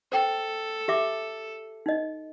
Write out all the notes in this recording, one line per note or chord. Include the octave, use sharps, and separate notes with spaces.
A4 C5 G5
G4 E5 D6
D#4 D#5